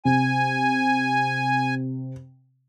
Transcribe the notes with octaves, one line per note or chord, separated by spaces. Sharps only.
C3 G#5